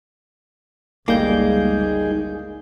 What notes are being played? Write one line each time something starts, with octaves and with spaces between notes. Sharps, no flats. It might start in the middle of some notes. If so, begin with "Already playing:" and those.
G1 C#2 G3 G#3 A#3 D#4 G#4 G6